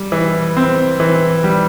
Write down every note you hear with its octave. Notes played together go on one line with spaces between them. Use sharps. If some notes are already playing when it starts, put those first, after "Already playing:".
Already playing: G3
E3
C4
E3
G3